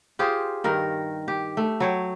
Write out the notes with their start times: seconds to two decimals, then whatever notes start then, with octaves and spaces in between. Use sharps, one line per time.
0.19 F4 G4 G#4 C5
0.64 G2 D#3 A#4
1.28 G4
1.57 A3
1.80 F#3 C#5 G5